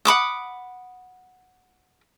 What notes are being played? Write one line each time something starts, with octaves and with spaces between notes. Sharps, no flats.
F#5 B5 D6 D#6